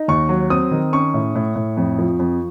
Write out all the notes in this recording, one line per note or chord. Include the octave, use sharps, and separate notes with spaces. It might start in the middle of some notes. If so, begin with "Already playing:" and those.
Already playing: D#4
D#2 C#6
F#3
C4 D#6
D#3
C#4 C#6
A2
A2
A2
F2
F3
F2